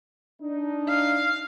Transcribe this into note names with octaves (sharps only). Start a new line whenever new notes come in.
D4 D#4
F5